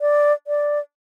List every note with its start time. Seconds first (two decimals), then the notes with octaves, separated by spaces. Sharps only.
0.01 D5
0.47 D5